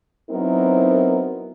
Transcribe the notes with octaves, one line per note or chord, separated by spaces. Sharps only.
F#3 B3 C4 D#4 E4 A#4